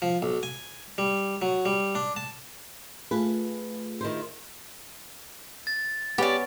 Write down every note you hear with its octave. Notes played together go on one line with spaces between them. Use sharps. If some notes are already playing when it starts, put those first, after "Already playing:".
F3
B1
G#5
G3
F#3
G3
D4
A5
A3 F4 G#4 B4
D#3 E4 C5
A6
B3 C#4 G4 D5